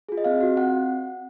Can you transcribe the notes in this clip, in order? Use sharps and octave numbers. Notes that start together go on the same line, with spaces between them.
F4 G#4
D#5
C4 F5
F#4
C4 F#5